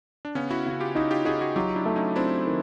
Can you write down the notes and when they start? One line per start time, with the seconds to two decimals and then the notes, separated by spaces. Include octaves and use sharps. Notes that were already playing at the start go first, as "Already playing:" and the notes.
0.25 D4
0.35 C#3 B3 C#4
0.51 E4 F#4
0.66 C#3 F#4
0.80 F4 G4
0.95 D#4 E4 F#4
1.11 F4 G4
1.25 D#4 F#4 G#4
1.41 F#4 G#4
1.56 F#3 F4 G4
1.76 D4 E4
1.86 A3
1.96 C#4 D#4
2.16 C4 D4 E4
2.47 D#3